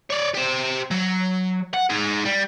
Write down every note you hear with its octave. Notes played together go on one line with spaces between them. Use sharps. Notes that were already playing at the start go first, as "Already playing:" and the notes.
C#5 D5
G4 C5
F#3
F#5
D#4 G#4
G3